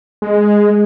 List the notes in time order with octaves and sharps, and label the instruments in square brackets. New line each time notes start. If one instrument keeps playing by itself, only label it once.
[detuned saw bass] G#3